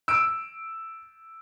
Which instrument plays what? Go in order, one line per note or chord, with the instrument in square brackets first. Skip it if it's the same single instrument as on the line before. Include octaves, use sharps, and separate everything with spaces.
[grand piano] E6 D7